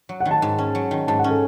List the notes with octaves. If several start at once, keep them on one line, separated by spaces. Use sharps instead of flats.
F#3
F#5
D#3
A5
G#2
C#4
F#3
D#3
G#2 A5
F#5
C#4
A4